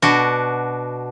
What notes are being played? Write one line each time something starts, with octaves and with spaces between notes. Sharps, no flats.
B2 D4 F#4